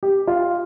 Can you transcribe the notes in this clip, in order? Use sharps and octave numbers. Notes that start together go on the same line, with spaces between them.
G4
F4